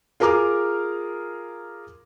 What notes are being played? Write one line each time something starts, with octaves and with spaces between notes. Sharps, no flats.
F4 G#4 A#4 A#5 D6 F6